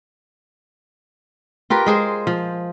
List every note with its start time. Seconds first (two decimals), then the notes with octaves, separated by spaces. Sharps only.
1.70 F4 G4 A#4 B4
1.86 G#3 G#4 C5
2.27 F3